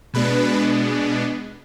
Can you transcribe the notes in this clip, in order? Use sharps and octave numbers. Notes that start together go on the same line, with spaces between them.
B2 G#3 B3 D4 B4